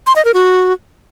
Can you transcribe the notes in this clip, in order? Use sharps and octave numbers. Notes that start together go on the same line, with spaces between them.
C6
D#5
A#4
F#4